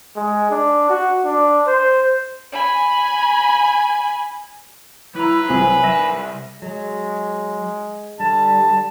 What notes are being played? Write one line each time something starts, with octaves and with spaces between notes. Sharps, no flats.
G#3
D4
F#4
D4
C5
G#5 B5
F#3 E4 B4 A#5
C2 C4 G#5
C2 E5 A#6 D#7
F#3 G#3
D3 G3 A5